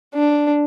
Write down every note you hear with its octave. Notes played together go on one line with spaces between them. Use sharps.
D4